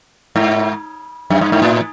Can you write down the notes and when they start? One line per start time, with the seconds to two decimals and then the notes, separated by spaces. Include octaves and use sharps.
0.36 G#2
1.30 F#2
1.41 G2
1.52 G#2
1.62 A2